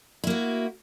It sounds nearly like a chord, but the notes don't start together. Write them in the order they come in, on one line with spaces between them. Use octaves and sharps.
E4 A#3 F#4